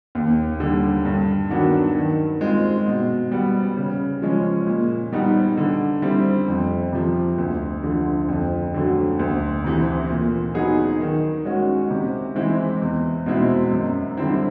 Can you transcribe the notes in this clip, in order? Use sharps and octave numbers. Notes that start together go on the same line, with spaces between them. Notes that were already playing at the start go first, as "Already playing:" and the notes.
D#2
D3 G3
G2
D#3 F#3 B3 D4
D#3
G#3 C4 F4
B2
G3 B3
C#3
F3 G#3 C#4
A#2
G3 B3 D#4
D3
G3 C4 E4
F2
C3 F3
D2
D3 F3
F2
D3 F#3 A3
D2
C3 E3
A#2
F#3 B3 D#4 G#4
D#3
G#3 C#4 F#4
C3
E3 G#3 C4 E4
E2
B2 G#3 C4 E4
F#2
D3 G3 C4 E4